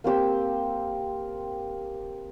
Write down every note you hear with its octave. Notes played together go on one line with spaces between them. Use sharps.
A#3 C4 G4 E6